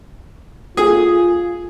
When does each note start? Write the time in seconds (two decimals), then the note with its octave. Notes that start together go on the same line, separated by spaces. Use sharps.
0.77 F4 G#4